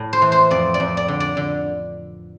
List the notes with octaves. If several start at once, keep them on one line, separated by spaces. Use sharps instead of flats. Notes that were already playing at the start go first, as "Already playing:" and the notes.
Already playing: A2
C5
E3
C5
F2 D5
D5
F2
D5
D3
D5
D3